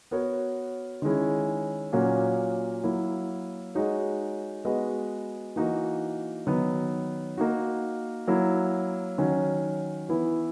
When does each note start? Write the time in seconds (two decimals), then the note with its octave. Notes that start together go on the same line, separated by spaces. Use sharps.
0.11 B3 F#4 A#4 C#5
1.02 D#3 G#3 C#4 E4
1.93 A#2 F#3 A#3 C#4 F#4
2.83 F#3 A#3 E4
3.75 G#3 D#4 F#4 C#5
4.65 G#3 B3 F#4 B4 D#5
5.56 E3 A#3 D#4 F#4
6.47 D#3 F#3 B3
7.38 A#3 D#4 F#4
8.27 F#3 A#3 E4
9.18 D#3 F#3 C#4 F#4
10.09 E3 B3 E4 B4